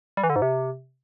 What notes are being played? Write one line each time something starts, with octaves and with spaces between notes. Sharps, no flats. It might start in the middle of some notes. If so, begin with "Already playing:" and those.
G3
E3
D3
G#2
C3